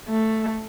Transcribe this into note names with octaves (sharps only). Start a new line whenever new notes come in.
A3